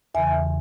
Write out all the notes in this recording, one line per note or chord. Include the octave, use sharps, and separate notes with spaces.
E2 C#3 E3 E5 G#5